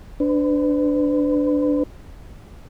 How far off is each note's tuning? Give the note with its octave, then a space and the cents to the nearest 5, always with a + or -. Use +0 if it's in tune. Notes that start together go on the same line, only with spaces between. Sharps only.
D4 +0 B4 +40